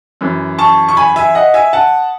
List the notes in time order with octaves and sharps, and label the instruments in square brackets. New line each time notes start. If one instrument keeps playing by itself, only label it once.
[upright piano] F#2 E3
A5 C#6
C#6
G#5 B5
E5 G#5
D#5 F#5
E5 G#5
F#5 A5